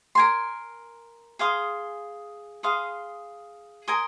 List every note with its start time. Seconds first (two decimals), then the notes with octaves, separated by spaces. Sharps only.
0.15 A#4 G#5 C6
1.39 G#4 F5 C6 D#6
2.63 G#4 F5 C6 D#6
3.88 A#4 G#5 C6 D#6